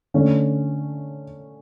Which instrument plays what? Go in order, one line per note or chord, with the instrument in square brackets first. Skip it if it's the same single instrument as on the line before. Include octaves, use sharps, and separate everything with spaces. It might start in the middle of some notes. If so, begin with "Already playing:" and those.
[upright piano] D3 A3 C#4